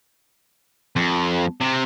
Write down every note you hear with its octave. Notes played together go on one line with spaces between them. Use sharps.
F2
C3